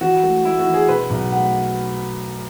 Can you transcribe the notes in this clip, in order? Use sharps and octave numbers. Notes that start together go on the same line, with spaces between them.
E3 F#4
A3
A3 E4
F#4
E3
G#4
B2 B4
B1
A3 F#5